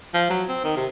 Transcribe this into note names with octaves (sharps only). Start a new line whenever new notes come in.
F3
F#3
C4
D#3
C3